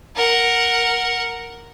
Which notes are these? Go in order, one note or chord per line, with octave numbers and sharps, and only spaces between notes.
A#4 F#5